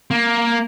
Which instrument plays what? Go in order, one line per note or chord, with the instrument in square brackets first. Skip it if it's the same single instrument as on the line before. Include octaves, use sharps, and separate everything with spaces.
[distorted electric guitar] A#3